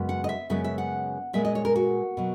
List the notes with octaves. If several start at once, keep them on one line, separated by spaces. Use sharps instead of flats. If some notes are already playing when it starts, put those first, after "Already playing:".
Already playing: F#2 C#3 G#3 B3
F#5
D#5
E5
F#2 C#3 G#3 B3 E5
E5
F#5
A#2 G#3 B3 E5
D#5
C#5
A#4
F#4
B2 F#3